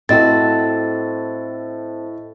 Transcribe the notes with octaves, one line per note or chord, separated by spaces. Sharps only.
A2 C4 F#4 A4 D#5 A6